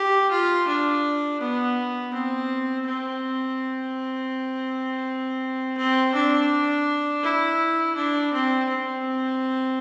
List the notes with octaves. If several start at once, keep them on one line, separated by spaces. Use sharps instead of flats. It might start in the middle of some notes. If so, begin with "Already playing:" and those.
Already playing: G4
F4
D4
B3
C4
C4
C4
D4
E4
D4
C4
C4